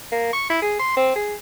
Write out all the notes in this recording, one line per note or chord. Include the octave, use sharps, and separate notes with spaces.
A#3
C#6
E4
G#4
C6
C4
G#4